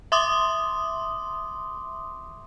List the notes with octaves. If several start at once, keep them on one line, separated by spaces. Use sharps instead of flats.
E5 C6 D6 D#6